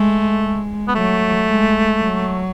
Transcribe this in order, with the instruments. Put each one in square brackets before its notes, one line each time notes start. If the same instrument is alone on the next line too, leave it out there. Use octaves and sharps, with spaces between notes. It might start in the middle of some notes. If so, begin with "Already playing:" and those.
Already playing: [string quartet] G#3 [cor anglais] A3
[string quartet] G#3
[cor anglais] B3
[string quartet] F#3 [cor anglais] A3
[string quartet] G#3
F#3